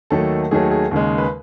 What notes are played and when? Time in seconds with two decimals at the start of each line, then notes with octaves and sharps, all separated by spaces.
0.10 D#2 D#3 F#3 A3 A4
0.51 D#2 D#3 F#3 A3 G#4
0.71 G#4
0.91 D#2 C#3 G#3
1.18 B4